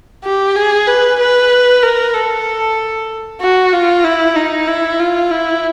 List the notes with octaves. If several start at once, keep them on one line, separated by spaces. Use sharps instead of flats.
G4
G#4
B4
B4
A#4
A4
F#4
F4
E4
D#4
E4
F4
E4